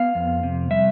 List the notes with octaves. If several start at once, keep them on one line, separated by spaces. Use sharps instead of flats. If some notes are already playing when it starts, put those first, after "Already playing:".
Already playing: B3 F5
F2
C3
G3 E5